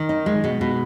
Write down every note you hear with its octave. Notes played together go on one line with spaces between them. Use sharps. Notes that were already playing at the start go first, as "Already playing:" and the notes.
Already playing: D#3
D#4
G#3
B2
B2